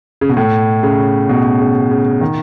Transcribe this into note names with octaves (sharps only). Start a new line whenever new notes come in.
C#3
B2
A2
C#3
B2
C#3
C#3
D#3